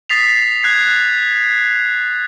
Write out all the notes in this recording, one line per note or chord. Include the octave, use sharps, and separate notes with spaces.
D#6 A6 B6 C7 F7
F#6 G#6 C7